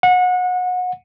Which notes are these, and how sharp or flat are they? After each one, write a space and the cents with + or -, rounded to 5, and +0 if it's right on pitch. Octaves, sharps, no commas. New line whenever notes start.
F#5 -25